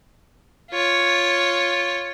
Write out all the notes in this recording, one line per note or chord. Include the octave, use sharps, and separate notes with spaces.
F4 C#5